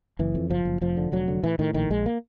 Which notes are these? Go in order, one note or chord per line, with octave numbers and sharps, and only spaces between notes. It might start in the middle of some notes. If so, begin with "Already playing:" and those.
F#1 E3
F2
F#1 F3
F#1
F1 F3
D3
F1 F#3
D3
A2 E3
A2 D#3
A#1 D#3
A#1 G#3
A#3